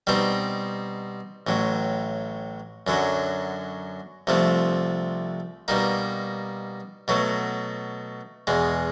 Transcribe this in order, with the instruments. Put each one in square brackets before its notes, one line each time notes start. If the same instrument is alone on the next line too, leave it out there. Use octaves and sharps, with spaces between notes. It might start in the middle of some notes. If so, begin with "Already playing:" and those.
[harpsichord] B2 G3 C4 D#4
A1 A2 F#3
F#2 D3 F#3
C2 C3 F3 A3
B2 G3 A#3 D#4
B2 F#3 A3
E2 B2 G#3